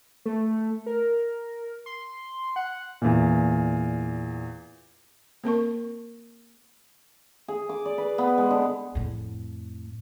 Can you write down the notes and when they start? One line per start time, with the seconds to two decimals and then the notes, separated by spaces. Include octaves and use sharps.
0.26 A3
0.86 A#4
1.86 C6
2.56 F#5
3.02 E2 A#2
5.44 A#3 C4 A#4 C#6
7.48 G#4
7.69 D6
7.85 D5
7.98 B4
8.18 B3
8.38 G#3
8.51 D3
8.95 F2 A2